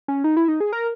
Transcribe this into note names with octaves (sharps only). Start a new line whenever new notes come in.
C#4
D#4
E4
D#4
G#4
A#4